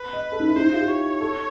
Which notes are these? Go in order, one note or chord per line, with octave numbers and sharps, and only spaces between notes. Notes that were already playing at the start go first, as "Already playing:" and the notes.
Already playing: B4
D#5
A4
D#4
E4
D#4 C5
E4
F4
G4
C#5
A4